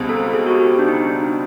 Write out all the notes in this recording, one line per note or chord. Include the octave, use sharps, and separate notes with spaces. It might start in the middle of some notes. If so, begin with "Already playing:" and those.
Already playing: C#2 B2 G3 C4 D#4
A4
G#4
F#4
G4
D4
D#4
D4